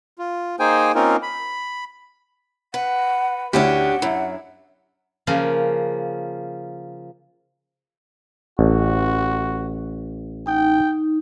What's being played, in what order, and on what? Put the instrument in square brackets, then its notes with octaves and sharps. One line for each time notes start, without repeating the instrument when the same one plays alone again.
[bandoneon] F4
A#3 D#4 G#4 C5 G5 G#5
A#3 C4 C#4 D#4 F4 A#4
B5
[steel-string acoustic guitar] B4 [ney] F#5
[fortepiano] D2 E4 [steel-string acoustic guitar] C#4 D4 G4 [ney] F#5
[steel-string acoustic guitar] F#2 [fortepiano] E4
[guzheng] C#3 F3 A#3
[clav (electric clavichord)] A1 [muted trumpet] F#4
[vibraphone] D#4 [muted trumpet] G5